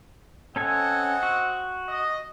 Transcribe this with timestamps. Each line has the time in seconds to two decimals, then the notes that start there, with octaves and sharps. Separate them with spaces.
0.56 C4 C#4 A4 D#5 F#5 G#5
1.23 F#4
1.89 D#5